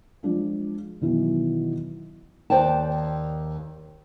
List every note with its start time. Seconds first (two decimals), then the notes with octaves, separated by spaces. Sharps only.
0.23 F3 G#3 D4 F4
1.01 B2 D#3 E3 F#3 B3
2.50 D#2 C5 D5 G5 A5